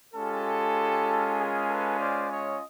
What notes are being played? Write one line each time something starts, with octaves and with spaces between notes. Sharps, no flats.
G#3 C#4 F4 G4 A4
G#4 A#4
A4 B4
C5 D5
C#5 D#5